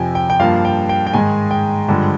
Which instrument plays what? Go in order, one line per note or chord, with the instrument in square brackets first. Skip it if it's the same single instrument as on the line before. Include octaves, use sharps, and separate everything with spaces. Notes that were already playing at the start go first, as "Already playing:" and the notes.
Already playing: [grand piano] F2 C3 F3 G5 G#5
G5
G5
G2 F3 A#3 F5
G5
G5
G5
G#2 D#3 G#3 G#5
G5
G2 D3 F3 G#3